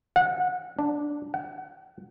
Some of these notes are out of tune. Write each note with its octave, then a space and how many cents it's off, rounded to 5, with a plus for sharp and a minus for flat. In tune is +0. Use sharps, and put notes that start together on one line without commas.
F#5 -25
D4 +0
F#5 +30